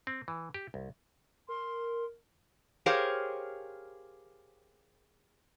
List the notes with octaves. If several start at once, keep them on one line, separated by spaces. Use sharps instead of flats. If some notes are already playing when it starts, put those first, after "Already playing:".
C4
E3
G4
C2
A#4 C6
G4 G#4 A#4 C5 C#5 F5